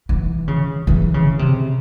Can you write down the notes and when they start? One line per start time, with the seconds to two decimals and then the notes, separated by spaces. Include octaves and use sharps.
0.09 E3
0.48 C#3
0.87 E3
1.14 C#3
1.39 C3